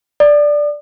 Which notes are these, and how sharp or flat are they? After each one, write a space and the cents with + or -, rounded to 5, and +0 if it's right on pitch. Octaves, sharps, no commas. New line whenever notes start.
D5 +0 D#6 -45